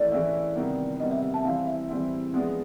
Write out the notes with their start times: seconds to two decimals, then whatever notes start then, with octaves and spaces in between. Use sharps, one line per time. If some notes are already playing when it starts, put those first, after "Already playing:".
Already playing: E3 A3 C#4 E4 D5
0.12 E3 A3 C#4 E4
0.56 C3 D#3 G3 B3
1.00 C3 D#3 G3 B3 D#5
1.11 E5
1.23 E5
1.34 A5
1.44 E3 G3 C4 E4 F5
1.67 E5
1.88 E3 G3 C4 E4
2.33 F3 G#3 B3 D4